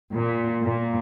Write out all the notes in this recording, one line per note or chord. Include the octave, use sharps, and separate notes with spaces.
A#2
A#2